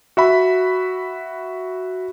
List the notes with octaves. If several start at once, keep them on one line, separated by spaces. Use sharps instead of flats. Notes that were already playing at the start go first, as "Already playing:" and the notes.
F#4 E5 B5